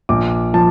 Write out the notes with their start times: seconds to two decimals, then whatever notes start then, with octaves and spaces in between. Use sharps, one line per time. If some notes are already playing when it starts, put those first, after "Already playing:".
0.09 A#1 D6
0.54 F3 A5